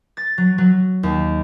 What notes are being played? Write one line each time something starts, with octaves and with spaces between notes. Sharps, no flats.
A6
F#3
F#3
D#2